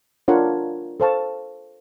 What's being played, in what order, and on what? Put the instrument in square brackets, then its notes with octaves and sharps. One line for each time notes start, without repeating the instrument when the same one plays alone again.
[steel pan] D4 F4 A#4 C#5 F#5
A4 C5 F5 A5 C#6